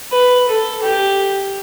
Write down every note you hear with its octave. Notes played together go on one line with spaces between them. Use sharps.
B4
A4
G4